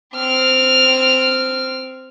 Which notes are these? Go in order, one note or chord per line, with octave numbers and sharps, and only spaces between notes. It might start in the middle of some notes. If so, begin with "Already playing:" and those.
C4 F6